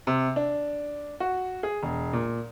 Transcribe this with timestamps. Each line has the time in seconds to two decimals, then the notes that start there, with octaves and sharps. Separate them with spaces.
0.07 C3
0.36 D4
1.20 F#4
1.63 G#4
1.83 E1
2.13 A#2